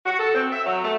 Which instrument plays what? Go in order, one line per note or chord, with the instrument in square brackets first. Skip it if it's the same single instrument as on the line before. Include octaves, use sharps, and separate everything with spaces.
[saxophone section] F#4
A4
C4
E5
F#3
A3